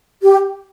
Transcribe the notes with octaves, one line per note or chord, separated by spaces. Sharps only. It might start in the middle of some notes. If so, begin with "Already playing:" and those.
G4